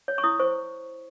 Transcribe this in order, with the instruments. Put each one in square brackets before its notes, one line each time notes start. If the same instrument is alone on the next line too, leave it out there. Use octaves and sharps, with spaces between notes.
[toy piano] C#5
C#6
E4 D#6
C5 C#6